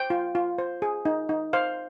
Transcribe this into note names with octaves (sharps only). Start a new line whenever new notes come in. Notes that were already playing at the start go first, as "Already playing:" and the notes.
Already playing: C5 G5
F4
F4
C5
G#4
D#4
D#4
C5 F5